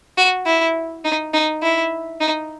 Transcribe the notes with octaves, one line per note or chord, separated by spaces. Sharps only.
F#4
E4
D#4
D#4
E4
D#4